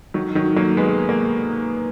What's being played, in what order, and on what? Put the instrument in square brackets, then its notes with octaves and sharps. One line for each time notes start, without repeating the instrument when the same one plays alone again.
[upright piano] D#3 F#3
D#3 F#3
F#3 A#3
G#3 B3
A#3